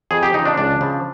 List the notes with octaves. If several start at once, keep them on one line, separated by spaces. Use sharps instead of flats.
F2 G#4
G4
C#3 F3 D#4
D4
C#2 D4
C#3 F3